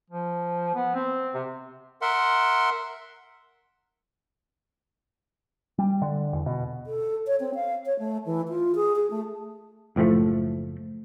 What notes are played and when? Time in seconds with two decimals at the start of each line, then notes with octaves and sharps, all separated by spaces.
0.10 F3
0.74 B3
0.95 C4
1.34 C3
2.02 A#4 E5 F#5 C6
5.78 G3
6.02 D3
6.33 E2
6.46 B2
6.87 A4
7.27 C#5
7.40 C4
7.55 F5
7.86 C#5
7.99 A3
8.26 E3
8.49 F4
8.75 G#4
8.96 G#4
9.10 A3
9.96 F#1 A2 F3 A3